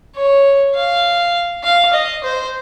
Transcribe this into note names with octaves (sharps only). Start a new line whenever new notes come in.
C#5
F5
F5
D#5
C5